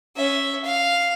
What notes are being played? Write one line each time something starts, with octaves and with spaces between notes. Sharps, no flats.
C#4 E5
F5